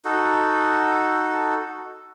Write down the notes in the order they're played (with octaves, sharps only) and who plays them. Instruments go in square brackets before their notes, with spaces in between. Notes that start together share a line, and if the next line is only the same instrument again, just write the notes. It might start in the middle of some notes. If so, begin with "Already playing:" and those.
[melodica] D#4 F#4 A4